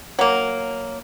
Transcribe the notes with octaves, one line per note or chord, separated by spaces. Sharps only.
F#3 A#3